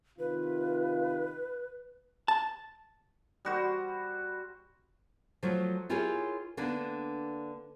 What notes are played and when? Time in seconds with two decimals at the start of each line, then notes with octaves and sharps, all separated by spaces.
0.19 C3 D#3 F4 B4
2.28 A5
3.45 G3 F#4 C5
5.43 F3 F#3 A3 F4
5.90 E4 F4 G4 G#4 A#4 C#5
6.57 D3 A#3 B3 D4